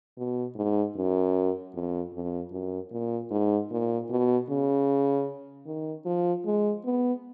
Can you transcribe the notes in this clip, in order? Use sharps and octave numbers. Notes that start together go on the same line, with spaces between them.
B2
G#2
F#2
F2
F2
F#2
A#2
G#2
A#2
B2
C#3
D#3
F3
G#3
B3